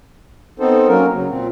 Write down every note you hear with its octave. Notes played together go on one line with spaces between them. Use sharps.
B3 C4 D#4 A4 C5
F#3 A#3 C#4 A#4
C#3 F#3
A#2 C4